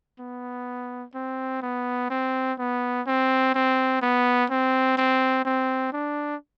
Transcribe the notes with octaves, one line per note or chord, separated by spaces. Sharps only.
B3
C4
B3
C4
B3
C4
C4
B3
C4
C4
C4
D4